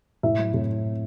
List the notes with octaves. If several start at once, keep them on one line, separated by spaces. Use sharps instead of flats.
A2 E4 E5
F#3
A2